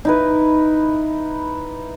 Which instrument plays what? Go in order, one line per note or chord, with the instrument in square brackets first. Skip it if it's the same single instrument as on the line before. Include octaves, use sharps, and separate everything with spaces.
[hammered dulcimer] D#4 E4 B4